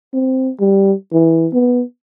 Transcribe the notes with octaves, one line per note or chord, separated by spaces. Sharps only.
C4
G3
E3
B3